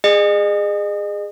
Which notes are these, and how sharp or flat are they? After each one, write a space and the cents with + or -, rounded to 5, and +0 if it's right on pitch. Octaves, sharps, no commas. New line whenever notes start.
G#4 -15 D#5 -40